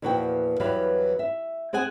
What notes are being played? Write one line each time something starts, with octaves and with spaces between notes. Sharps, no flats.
E2 A#2 F3 F#4 B4 G5
E2 E3 F#3 G3 B4 F5
E5
C4 G#4 F#5 G#5